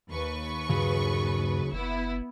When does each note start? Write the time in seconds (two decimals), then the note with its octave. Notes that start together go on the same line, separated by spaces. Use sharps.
0.10 D#2 B4 C#6
0.69 G2 C#3 F#3 G#4
1.73 F#1 B3 E4